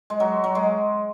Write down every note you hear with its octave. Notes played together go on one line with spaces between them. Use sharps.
G#3
F#3
F#3
G#3